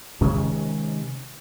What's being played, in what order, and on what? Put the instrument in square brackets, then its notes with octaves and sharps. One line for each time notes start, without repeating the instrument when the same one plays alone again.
[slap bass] C3 D#3 G#3 C#4